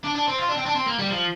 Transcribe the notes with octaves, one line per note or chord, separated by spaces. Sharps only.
D4
D4
C4
F4
D4
C4
D4
C4
A#3
G3
F3